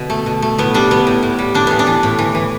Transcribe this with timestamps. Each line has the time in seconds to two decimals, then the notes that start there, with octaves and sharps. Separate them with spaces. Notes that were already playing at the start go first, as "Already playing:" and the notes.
Already playing: B2 D3
0.10 A3
0.26 B2
0.42 A3
0.58 A2 B3
0.74 G3 D4
0.91 A2 B3
1.07 A2
1.23 A2
1.39 G3
1.54 A2 D4
1.67 E3 B3
1.79 D4
1.87 E3
2.03 A2
2.19 E3
2.35 E3